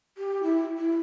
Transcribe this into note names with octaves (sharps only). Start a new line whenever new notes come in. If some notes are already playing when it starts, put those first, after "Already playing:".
G4
E4
E4